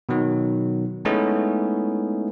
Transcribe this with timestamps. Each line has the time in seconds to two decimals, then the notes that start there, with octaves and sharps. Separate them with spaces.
0.09 B2 D#3 F#3
1.05 G#3 A3 B3 C#4 D#4 E4